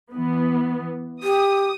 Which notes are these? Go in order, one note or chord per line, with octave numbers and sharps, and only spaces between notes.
E3 B3
G4 D#6